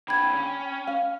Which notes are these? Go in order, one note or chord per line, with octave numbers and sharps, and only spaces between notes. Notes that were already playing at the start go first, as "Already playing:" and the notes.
A#2 D3 G5 B5 G#6
C#4
F5